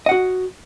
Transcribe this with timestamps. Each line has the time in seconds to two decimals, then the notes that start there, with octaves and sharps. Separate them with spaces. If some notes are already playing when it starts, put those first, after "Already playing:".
0.06 D#5
0.09 F#5
0.11 F#4